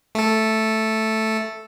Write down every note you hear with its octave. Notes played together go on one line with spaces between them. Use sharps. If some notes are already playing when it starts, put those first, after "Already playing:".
A3 A4